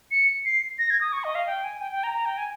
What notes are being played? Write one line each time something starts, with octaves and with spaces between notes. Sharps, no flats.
C#7
C7
A#6
G#6
D#6
C#6
D#5
F5
G5
G#5
G5
G5
A#5
A#5
G5
G#5